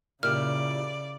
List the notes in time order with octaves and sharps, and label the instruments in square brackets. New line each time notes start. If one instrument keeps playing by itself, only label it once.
[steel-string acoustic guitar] A#2 E4 G4 [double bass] C#3 [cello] D5 [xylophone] F6